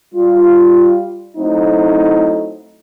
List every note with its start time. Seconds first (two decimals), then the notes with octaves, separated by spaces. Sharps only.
0.14 G3 F4
1.37 F#3 A3 C4 D#4 E4